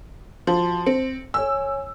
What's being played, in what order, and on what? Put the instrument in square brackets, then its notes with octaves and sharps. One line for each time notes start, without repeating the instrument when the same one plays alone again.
[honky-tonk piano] F3 [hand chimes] F#4 A5 C6
[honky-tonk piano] C4 [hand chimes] C#7
[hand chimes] C#5 G#5 [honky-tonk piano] E6